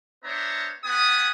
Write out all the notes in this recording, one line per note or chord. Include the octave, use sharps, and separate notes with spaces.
B3 D4 C5 C#5 E5 A#5
B3 G4 F#5 G#5 D#6